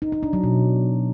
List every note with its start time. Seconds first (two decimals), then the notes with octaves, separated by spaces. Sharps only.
0.02 D#4
0.12 D#4
0.23 D4
0.33 F#3
0.44 B2